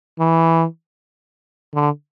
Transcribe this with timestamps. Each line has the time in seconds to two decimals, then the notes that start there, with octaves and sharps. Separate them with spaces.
0.19 E3
1.74 D3